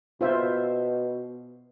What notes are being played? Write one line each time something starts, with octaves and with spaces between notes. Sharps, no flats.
B2 F4 C5 E5